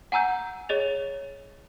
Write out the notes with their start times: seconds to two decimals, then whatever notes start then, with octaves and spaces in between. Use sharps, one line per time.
0.12 F#5 G#5 A#5 E6 G6
0.69 G#4 C#5 D#5 A6 F7